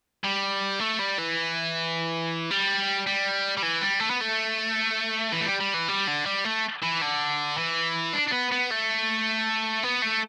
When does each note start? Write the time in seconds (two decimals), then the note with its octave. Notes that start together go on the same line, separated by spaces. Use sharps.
0.24 G3
0.80 A3
1.00 G3
1.18 E3
2.50 G3
3.07 G3
3.57 G3
3.62 E3
3.81 G3
4.00 A3
4.10 B3
4.21 A3
5.32 E3
5.41 A3
5.46 G3
5.60 G3
5.74 E3
5.88 G3
6.07 D3
6.26 G3
6.45 A3
6.82 E3
7.01 D3
7.58 E3
8.14 D4
8.28 D4
8.33 B3
8.52 B3
8.71 A3
9.83 B3
10.02 A3